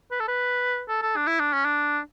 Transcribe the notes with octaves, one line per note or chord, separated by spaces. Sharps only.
B4
A4
B4
A4
A4
D4
E4
D4
C#4
D4